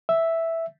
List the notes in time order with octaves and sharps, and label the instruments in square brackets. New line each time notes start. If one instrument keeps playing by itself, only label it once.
[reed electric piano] E5